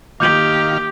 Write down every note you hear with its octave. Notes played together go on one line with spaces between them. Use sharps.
D#3 A#3 G4 F5 D6 G6 F7